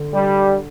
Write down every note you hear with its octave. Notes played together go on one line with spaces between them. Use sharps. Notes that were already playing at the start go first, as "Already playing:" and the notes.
Already playing: D3
G3